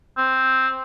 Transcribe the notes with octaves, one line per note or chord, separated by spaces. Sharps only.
C4